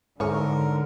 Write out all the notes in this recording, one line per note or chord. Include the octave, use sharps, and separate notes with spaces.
G#2 D3 E4 G#4 A#4 C#5